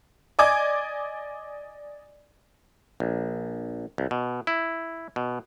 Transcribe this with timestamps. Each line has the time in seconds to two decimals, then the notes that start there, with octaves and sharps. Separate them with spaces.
0.39 D5 D#5 G#5 D6 G#6
3.00 A#1
3.98 C2
4.11 B2
4.47 E4
5.16 B2